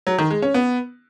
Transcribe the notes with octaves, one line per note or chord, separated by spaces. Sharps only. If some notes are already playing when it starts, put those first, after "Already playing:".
F#3
D#3
G#3
C#4
B3